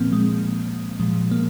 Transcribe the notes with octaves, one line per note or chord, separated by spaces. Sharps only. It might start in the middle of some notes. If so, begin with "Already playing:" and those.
Already playing: A#2 F3 A#3 C4
G#3
A#2 F3 G#3
A#3